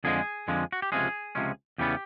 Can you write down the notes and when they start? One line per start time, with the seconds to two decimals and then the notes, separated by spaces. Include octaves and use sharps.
0.04 F2 D3 F3 G#3 G#4
0.48 F2 D3 F3 G#3
0.72 F#4
0.82 G4
0.92 C#2 C3 F3 G#3 C#4 G#4
1.35 C#2 C3 F3 G#3 C#4
1.78 E2 C#3 E3 G3 B3 G4